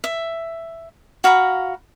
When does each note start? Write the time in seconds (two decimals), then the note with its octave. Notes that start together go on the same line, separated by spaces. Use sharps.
0.04 E5
1.24 F#4 F5 A#5 B5